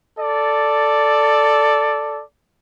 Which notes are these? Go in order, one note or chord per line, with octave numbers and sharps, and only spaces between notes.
A4 D5